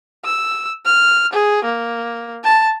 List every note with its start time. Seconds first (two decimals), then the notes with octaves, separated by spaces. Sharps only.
0.24 E6
0.85 F6
1.33 G#4
1.64 A#3
2.44 A5